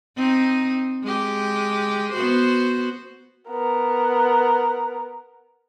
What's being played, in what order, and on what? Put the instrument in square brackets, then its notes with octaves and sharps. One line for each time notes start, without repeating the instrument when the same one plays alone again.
[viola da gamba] C4 D#4
G#3 G4
B3 F#4 C5
[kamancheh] B3 A#4